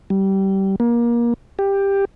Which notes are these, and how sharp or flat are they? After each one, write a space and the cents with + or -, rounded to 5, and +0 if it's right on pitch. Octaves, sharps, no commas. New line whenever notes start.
G3 -20
A#3 +25
G4 +10